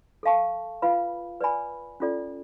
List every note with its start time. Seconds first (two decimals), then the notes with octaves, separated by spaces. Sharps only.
0.23 A4 F5 A5 C#6
0.82 F4 B4 F5 B5
1.41 B4 D5 G#5 B5
2.00 C#4 F4 A4 D5